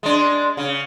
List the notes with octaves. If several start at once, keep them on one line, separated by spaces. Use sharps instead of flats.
G#3 D4
C#3